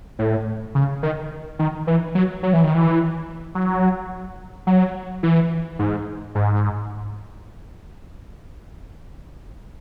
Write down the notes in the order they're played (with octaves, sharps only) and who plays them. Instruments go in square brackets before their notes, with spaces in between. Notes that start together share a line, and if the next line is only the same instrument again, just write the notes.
[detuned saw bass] A2
C#3
D#3
D#3
E3
F#3
F#3
E3
D#3
E3
F#3
F#3
E3
G#2
G#2